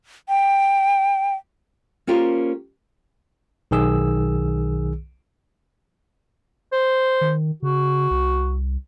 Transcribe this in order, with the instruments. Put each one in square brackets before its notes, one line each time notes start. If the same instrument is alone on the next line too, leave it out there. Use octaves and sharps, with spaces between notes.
[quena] G5
[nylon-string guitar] A#3 C#4 F4 G4 A#4 C5
[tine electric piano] B1 D#3 G#4 E6
[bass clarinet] C5
[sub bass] D#3
[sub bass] C#3 [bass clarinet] F#4
[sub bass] C2